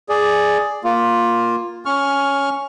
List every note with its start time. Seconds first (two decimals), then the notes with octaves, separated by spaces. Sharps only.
0.09 G#4 D5
0.84 A#3 F4
1.86 C#4 C#6 F6